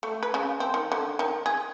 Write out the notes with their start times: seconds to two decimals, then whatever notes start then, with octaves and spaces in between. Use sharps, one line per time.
0.03 A3
0.23 B4
0.34 C#3
0.60 C4
0.74 D#3
0.92 D3
1.19 D#3
1.46 G#4